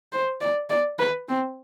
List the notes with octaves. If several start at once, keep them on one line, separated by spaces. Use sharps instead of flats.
C5
D5
D5
B4
C4